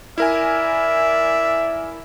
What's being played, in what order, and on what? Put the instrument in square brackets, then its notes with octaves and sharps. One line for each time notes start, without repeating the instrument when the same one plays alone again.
[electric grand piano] E4 A#4 G#5 [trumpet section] D5 E5